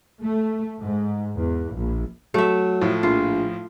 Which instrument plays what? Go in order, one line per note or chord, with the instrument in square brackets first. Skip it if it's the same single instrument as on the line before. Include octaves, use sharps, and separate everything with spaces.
[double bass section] A3
G#2
E2
A#1
[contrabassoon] F#3 [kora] A3 E5
[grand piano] A2 F3
[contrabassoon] A#1 [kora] F4